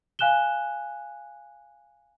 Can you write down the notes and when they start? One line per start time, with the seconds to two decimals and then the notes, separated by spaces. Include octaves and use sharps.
0.19 F5 G#5 F#6 E7 G7